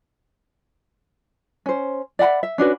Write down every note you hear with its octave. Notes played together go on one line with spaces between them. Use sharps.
C#4 C5
D5 E5 F#5 B5
E5
C#4 D4 F#4 B4